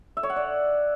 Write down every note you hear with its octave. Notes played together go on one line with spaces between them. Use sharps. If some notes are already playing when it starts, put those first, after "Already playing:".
E5
C#5
F#5
D5